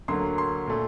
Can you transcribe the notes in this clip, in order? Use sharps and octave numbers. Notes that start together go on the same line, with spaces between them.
D2 D3 F#3 A#3 C6
C6
A#2 A3